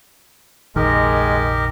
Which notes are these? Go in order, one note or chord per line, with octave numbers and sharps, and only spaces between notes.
F1 A#1 D#3 G#3 G4 A#4 D#5